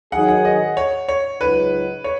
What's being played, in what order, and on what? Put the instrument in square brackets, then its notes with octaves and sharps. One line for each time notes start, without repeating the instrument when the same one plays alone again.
[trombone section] D#3 F#3 D#4 G#4 [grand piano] F#5
[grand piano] F#5
D#5
C#5
C#5
[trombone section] C#2 C#3 F#3 D#4 [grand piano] B4
[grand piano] C#5